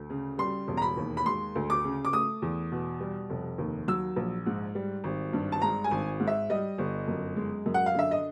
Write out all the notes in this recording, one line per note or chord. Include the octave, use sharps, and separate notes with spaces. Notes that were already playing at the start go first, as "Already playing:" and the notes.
Already playing: D2
C#3
G3 C6
E1
A#5
B5
D#2
B5
G#3 C6
D2
D6
C#3
D6
A3 D#6
E2
B2
G3
F1
D#2
F#3 E6
A#1
G#2
G3
G#1
G2
A5
G#3 A#5
G#5
G#1
G#2
E5
G3 D#5
G1
F#2
G#3
F#2
F#5
F5
D3 E5
D#5